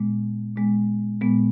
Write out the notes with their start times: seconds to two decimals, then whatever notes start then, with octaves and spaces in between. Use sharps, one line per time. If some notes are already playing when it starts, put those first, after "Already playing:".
Already playing: A#2 G#3 B3
0.56 A#2 G#3 B3
1.21 A#2 G#3 B3